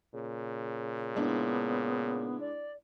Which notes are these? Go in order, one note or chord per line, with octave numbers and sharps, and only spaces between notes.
A#2 C#3
G#3 B3 D4 E4
D5